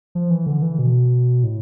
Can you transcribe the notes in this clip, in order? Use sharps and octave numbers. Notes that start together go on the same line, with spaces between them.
F3
E3
D3
E3
B2
A2